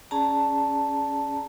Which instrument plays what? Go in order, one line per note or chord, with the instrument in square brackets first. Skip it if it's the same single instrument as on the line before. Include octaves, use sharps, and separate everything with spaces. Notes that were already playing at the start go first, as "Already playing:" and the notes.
[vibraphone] C#4 G#4 D5 A5 A#5